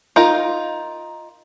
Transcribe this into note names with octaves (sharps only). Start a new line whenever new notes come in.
D#4 F4 A#4